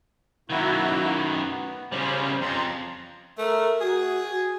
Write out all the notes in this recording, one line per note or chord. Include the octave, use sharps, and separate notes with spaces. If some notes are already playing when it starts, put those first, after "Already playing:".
F#2 D#3 A#3 E4 F#4
B3
C#3 G3 C#4 C5
F2 A#5 C6
A3 A#4
F#4 G#4